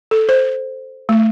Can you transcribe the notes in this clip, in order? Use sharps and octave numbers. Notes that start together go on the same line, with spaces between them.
A4
C5
A3